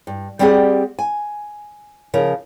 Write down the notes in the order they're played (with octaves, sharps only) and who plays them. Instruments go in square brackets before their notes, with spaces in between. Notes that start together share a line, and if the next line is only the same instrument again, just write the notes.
[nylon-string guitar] G2
G3 C4 G4 G#4 D5 F#5
G#5
C#3 F3 A#4